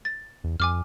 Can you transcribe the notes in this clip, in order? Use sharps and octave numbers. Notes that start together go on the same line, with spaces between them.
A6
E2
F2 G#5 D6 F6